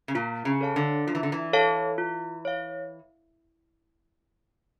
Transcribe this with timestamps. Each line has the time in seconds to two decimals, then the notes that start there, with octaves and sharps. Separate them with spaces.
0.08 C#3
0.15 A#2 F4
0.45 C#3
0.61 A4 C#5 F5 A5
0.76 D3
1.07 F3 F4
1.15 E3
1.23 D3
1.32 E3
1.53 A4 C#5 F5 A5
1.98 F4
2.45 C#5 F5